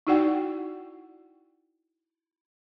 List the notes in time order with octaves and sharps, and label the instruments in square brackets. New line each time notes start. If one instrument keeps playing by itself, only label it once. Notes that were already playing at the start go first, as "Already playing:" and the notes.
[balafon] D#4 E4 F#4 D5 F#5 G5